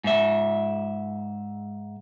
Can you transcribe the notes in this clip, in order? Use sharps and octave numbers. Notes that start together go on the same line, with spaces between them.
G#2 E5